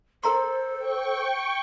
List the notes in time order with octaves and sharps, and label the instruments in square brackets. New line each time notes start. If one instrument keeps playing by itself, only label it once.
[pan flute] A4 [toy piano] A#4 A#5 C6 [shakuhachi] C5
[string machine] G5 C#6